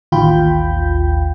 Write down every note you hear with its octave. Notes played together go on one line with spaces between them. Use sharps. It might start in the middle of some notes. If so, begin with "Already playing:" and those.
A1 D#2 F4 G5 B5 G6